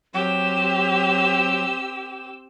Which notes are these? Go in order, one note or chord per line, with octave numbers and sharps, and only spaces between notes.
F#3 C4 G4 E6